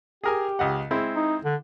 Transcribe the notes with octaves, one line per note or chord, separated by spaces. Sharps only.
G4 G#4 A#4 G#5
C#2 D#5 F#5
G#3 C4 E4
D#4
D3